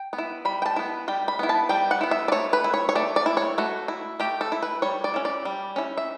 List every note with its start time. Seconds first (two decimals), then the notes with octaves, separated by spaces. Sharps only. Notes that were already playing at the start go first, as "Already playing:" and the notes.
Already playing: G5
0.13 B3
0.18 E4
0.45 G3 B5
0.62 G5
0.66 A5
0.76 B3 E4
1.08 G3 G5
1.28 B5
1.39 B3 E4
1.49 A5
1.69 G3 G5
1.91 F#5
2.01 B3 E4
2.11 E5
2.28 D5
2.32 A3 C#5
2.53 B4
2.64 E4
2.74 C#5
2.89 C#5
2.95 A3 D5
3.16 D5
3.26 E4
3.37 C#5
3.58 A3 F#4
3.88 E4
4.20 A3 G4
4.41 A4
4.52 E4
4.62 B4
4.82 G3 C#5
5.04 D5
5.14 C#4 E4
5.25 D5
5.45 G3
5.76 C#4 E4
5.97 E5